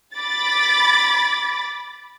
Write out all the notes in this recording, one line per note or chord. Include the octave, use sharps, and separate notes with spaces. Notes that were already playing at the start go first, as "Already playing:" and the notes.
B5 D6 A6